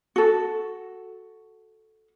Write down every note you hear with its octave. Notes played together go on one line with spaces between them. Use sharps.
F#4 A4